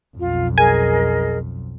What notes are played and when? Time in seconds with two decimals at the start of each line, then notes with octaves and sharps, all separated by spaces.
0.17 B1 F2 F4
0.58 G#4 A#4 D#5 G#5